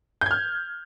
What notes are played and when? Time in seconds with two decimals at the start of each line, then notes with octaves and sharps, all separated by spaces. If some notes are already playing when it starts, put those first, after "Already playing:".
0.21 G6
0.26 G#6
0.31 F6